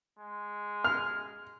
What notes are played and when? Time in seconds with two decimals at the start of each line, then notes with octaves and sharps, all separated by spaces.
0.19 G#3
0.84 F6